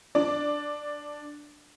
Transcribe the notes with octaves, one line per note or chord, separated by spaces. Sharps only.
D4 D5